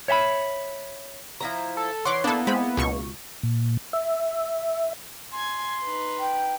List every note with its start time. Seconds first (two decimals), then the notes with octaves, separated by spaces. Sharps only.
0.08 C#5 E5 G5 B5
1.41 F3 E4 A#5
1.77 A4
2.05 E3 C#5 F#5 C6 D6
2.24 A#3 B3 D4 E4 A4
2.47 G#3 C4 B5
2.77 C#2 B2 C#6
3.43 A#2
3.93 E5
5.33 G#5 C6 G#6
5.83 D#4 B4
6.19 G5